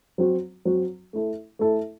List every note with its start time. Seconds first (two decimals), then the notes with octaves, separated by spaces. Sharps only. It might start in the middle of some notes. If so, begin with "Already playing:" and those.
0.18 F#3 C4 F#4
0.65 F#3 C4 F#4
1.13 A3 E4 A4
1.59 A3 E4 A4